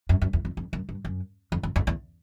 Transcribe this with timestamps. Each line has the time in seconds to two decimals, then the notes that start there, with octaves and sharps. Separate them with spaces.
0.09 F#2
0.22 F#2
0.33 E2
0.45 F2
0.57 F2
0.73 F#2
0.89 G2
1.05 F#2
1.52 F2
1.63 F2
1.76 F2
1.87 E2